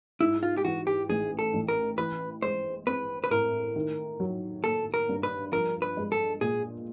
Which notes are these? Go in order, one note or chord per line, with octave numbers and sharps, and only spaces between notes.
G#2 E4
F4
G4
E3 F#4
G4
A1 G#4
A4
A1
A#4
E3 B4
G#3 C5
C4 B4
B4
A2 A#4
D#3
F#3
A#3 A4
A#4
G2
B4
F3 A#4
B4
G#3
A4
A#2 G#4